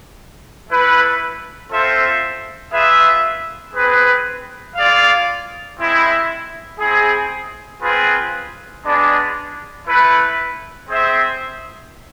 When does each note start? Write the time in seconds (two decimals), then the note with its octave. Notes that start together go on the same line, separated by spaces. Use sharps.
0.69 A3 E4 B4
1.71 C4 F4 A4 C5 E5
2.73 F4 G#4 B4 E5
3.74 C4 G#4 B4
4.76 F4 G#4 D5 F5
5.78 G#3 C4 E4
6.80 C4 E4 G#4
7.82 C4 F4 G#4 B4
8.83 G#3 B3 D4 G#4
9.85 A3 E4 B4
10.88 C4 G#4 C5 E5